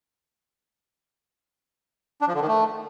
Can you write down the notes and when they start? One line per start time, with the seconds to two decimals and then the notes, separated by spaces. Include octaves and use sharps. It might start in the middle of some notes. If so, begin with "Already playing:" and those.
2.21 D4
2.28 F3
2.34 D3
2.41 D#3
2.47 A3